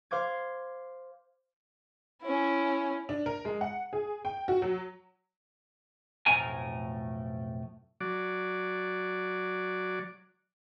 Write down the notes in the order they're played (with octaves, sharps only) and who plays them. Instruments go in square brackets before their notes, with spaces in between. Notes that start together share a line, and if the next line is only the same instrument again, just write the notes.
[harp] C5 F5 D6 G#6
[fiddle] C#4 E4
[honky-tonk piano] D4
A#4
G#3
F#5
G#4
G5
F#4
F#3
[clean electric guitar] B1 F2 A2 A3 A#4 G#5
[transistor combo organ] F#3 D5